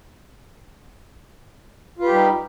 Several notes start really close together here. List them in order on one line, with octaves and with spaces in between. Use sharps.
F4 B4 G4 G3 D#4